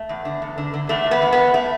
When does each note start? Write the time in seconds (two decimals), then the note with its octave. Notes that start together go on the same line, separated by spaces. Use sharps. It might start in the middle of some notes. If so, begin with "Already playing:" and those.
Already playing: A3
0.09 E2
0.25 D3
0.42 E2
0.58 D3
0.74 D3
0.89 E2 A3
1.06 E2
1.11 B3
1.22 E2
1.33 B3
1.38 E2
1.54 A3